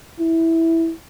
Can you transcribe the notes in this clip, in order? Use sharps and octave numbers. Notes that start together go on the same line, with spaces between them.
E4